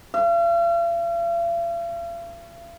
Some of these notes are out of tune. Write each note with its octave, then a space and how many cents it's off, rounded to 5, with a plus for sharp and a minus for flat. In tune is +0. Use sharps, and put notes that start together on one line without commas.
F5 -45